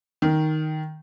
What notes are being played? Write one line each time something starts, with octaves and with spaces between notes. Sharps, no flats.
D#3